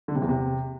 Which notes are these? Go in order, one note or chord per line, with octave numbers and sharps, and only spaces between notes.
D3
C3
E2
C3